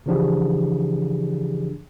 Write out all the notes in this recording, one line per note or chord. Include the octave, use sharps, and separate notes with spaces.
C#3 E3 F3 D4 G4 G#4